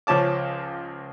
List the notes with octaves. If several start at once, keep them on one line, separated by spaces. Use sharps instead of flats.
C#2 F3 C#4 A5 D6